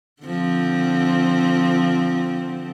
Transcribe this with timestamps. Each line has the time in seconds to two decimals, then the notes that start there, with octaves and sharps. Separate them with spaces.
0.22 D3 F3 C4